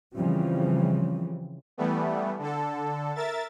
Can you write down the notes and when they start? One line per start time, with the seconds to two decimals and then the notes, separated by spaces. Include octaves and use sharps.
0.16 C#3 E3 F3 G3 C4 C#4
1.78 E3 G3 A3 B3
2.39 D3 A4
3.15 A#4 E5 A6